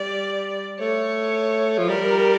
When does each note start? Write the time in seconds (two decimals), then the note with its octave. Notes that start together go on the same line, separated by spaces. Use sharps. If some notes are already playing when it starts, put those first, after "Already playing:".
Already playing: G3 D5
0.80 A3 C#5
1.78 F3
1.88 G3 A#4